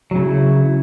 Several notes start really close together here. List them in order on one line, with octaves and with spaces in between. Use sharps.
F#3 C#3 E4